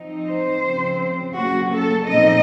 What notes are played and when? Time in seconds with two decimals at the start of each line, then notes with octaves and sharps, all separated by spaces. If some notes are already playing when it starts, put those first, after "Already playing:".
Already playing: F3 C4 D#4
0.27 C5
0.64 C#3 F3 C4
1.35 C#3 F#3 A#3 C#4 F#4
1.71 A4
2.06 A#2 F3 C4 D#4 D#5